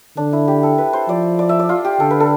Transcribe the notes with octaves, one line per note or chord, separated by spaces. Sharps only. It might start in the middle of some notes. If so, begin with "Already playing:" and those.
D3 D4
E4
G4
A4
B4
C5
F3 D5
D5
E5
D5
F4
G4
D3 A4
B4
A4